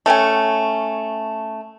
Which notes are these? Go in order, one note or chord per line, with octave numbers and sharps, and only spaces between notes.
A3 C#4 G5 G#5